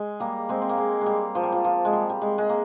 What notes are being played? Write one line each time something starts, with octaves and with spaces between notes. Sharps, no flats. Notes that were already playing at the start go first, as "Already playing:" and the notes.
Already playing: G#3
G3 A#3
G#3 C4
C4
A#3
G#3
G#3
G3
F3
G3
F3
F3
G#3
G3
G3
G#3
G#3
A#3